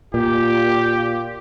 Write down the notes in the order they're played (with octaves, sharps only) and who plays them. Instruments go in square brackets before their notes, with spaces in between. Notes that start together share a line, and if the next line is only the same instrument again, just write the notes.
[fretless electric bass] A#2 [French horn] F4 [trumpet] G4